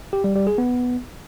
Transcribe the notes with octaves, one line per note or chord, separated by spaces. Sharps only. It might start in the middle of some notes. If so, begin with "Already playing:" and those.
G4
G3
G3
G#4
B3